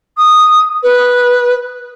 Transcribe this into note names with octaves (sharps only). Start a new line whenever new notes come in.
D#6
B4